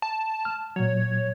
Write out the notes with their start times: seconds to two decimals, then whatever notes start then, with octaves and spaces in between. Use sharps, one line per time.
0.02 A5
0.45 F6
0.76 A#2 F#3 C#5